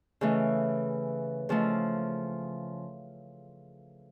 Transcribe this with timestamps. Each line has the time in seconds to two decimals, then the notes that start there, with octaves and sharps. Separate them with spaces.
0.21 C#3 E3 A3
1.49 C#3 F3 A3